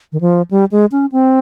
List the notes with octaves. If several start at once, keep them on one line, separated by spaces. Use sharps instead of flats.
D#3
F3
G3
G#3
C#4
C4